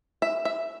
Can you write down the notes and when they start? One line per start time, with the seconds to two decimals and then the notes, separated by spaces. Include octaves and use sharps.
0.22 E5
0.45 E5